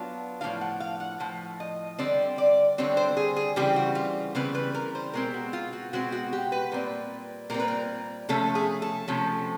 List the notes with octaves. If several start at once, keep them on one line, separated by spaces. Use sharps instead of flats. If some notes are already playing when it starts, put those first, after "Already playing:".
Already playing: F#3 B3 D4 F4
A2 F3 A3 D4 F4 F5
F#5
F5
F#5
A2 F3
D#5
D3 G3 C4 D5
D5
D3 G3 C4 C#5
C5
G#4
G#4
C#3 E3 G3 C4 G4
F#4
F4
C#3 E3 G3 C4 B4
B4
A#4
C5
B2 G#3 C4 A#4
F#4
F4
F#4
B2 G#3 C4 F#4
F#4
G4
B4
A#2 G3 C4
A#2 G3 C4 A#4
B4
A#4
C3 F3 A3 C#4 A4
G#4
A4
C3 F3 A3 C#4